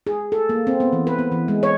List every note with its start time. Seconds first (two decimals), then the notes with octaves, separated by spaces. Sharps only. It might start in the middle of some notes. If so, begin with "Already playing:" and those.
0.07 G#4
0.32 A4
0.49 A#3
0.67 C4
0.80 B3
0.93 E3
1.07 B4
1.19 B3
1.32 E3
1.48 G#3
1.63 C#5